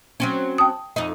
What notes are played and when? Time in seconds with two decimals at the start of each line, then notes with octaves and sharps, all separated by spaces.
0.20 F#3 C4 C#4
0.58 G5 A5 D#6
0.96 F2 D#4